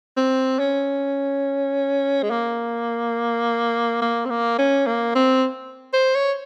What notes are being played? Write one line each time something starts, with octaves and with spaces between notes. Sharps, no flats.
C4
C#4
G#3
A#3
A#3
C4
A#3
C#4
A#3
C4
C5
C#5